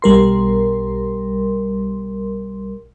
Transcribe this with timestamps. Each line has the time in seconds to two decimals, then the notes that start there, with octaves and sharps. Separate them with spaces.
0.02 B1 G3 A#4 C6